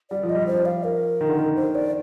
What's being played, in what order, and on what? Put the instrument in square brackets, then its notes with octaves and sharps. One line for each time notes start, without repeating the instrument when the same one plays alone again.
[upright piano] G3 [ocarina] D5
[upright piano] F3
[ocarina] D#5
[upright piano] G3
[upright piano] F3 [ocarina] C5
[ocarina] F5
A#4
[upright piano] D#3
D3
D#3
[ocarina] C5
D5